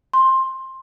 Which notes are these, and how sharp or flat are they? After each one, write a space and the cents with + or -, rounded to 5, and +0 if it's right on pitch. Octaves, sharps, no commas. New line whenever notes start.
C6 +15